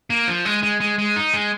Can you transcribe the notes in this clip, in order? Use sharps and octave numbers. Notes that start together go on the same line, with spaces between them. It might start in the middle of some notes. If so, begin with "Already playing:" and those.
A#3
F3
G#3
G#3
G#3
G#3
D#4
G#3